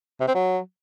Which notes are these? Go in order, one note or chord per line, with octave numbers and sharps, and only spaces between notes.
C3
C4
F#3